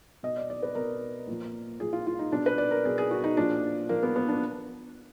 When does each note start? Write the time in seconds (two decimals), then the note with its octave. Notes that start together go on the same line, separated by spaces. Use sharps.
0.23 B2 D#5
0.37 D5
0.50 D5
0.63 B4
0.75 B2 A#4
1.28 A#2 F3
1.80 A#2 F3 G#4
1.93 F4
2.07 F4
2.19 D#4
2.32 B2 D4
2.46 B4
2.58 D5
2.71 A#4
2.85 B2 G#4
2.98 G#4
3.11 F#4
3.24 D#4
3.37 A#2 F3 D4
3.89 A#2 F3 A#3
4.03 B3
4.16 B3
4.28 D4